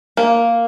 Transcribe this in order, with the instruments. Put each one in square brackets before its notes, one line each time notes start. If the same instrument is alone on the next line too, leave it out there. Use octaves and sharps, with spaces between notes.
[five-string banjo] A#3